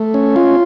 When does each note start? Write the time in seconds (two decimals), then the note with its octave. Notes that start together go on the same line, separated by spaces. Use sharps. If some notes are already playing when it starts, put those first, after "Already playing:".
Already playing: A3
0.14 C#4
0.36 F4